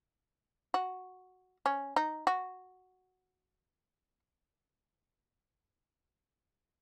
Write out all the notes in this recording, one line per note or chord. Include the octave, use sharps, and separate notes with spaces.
F#4
C#4
D#4
F#4